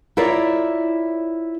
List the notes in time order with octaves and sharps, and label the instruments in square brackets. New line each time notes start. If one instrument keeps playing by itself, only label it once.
[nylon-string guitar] E4 F4 A#4 C#5 D5